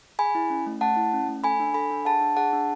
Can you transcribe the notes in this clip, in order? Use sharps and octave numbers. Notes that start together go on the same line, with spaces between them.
G#4 G#5 B5
E4
C#4
A3
A3 F#5 A5
E4
C#4
A3
A4 G#5 B5
D4
A4 G#5 B5
D4
G#4 F#5 A5
D4
G#4 F#5 A5
D4